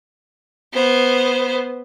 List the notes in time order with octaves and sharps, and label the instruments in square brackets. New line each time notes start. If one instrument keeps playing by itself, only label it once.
[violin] B3 C5